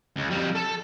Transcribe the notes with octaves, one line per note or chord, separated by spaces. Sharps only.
C#2
F2 G3
A4 A5